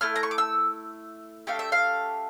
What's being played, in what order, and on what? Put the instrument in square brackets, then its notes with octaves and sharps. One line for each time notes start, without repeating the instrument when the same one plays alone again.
[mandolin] A3 E4 F6
A#5
C#6
D6
E6
A3 D4 G4 F5
E5
F5